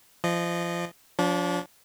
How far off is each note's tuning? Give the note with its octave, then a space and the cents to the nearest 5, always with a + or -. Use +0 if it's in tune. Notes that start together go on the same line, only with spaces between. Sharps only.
F3 -25 D#5 -25
F3 +25 D4 -30